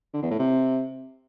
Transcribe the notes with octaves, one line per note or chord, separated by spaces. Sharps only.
D3
E2
A2
C3